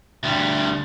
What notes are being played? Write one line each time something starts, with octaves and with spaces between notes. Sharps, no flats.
D2 G3